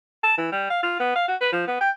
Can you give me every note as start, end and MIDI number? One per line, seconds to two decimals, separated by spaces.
0.23 0.34 81
0.38 0.51 52
0.52 0.67 55
0.70 0.81 77
0.83 0.95 65
1.00 1.15 59
1.16 1.27 77
1.28 1.36 66
1.41 1.52 71
1.52 1.66 53
1.67 1.77 59
1.81 1.90 79